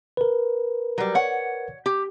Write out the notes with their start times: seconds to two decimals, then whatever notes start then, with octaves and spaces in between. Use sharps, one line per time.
0.17 A#4 B4
0.98 F#3 G3
1.15 C#5 F#5
1.86 G4